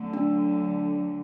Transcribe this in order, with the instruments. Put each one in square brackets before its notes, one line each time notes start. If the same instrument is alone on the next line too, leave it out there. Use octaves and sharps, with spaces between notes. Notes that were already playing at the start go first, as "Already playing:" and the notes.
Already playing: [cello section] D3 F#3 A3
[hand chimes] D4